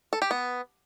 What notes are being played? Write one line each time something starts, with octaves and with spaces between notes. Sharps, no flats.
A4
G4
B3